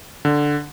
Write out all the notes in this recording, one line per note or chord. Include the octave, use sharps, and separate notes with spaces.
D3